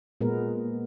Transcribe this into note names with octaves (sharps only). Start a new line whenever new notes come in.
A#2 G#3 B3 A#4